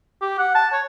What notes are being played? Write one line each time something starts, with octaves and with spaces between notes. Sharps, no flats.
G4
F#5
A5
C#5